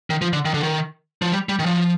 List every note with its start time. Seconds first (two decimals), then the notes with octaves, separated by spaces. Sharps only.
0.10 D#3
0.22 F3
0.33 D3
0.45 D#3
0.54 D3
0.63 D#3
1.22 F3
1.32 G3
1.49 G3
1.59 D#3
1.66 F3